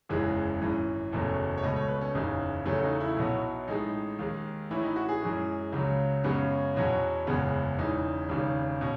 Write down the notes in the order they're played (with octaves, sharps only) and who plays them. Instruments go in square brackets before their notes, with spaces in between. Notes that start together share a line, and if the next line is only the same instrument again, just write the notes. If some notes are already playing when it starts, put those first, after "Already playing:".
[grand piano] F#1 E2 C#3 E3 G#3
G#1 F#2 E3
F#1 E2 B2 F#3 A3
C#5
C#2 B2 A3 D#5
C#5
B4
C#4
F#1 E2 C#3 D#4
E2 C#3 F#3 A3 C#4
D#4
E4
B1 B2 F#3 B3
A1 A2 G#3 D#4
D#2 D#3 G#3
A1 A2 E3 E4
D#4
F#4
G#4
F#2 E3 G#3
C#2 C#3 F#3
F#2 C#3 G#3 B3 C#4
E2 B2 F#3 B3
F#1 E2 C#3 G#3 B3
E1 E2 C#3 E3 D#4
E1 D#2 C#3
B2 C#4